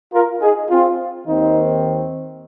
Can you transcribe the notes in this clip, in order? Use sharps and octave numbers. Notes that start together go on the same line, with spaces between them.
F4 A#4
D#4 G#4
C4 F4
D#2 D#3 C4 D#4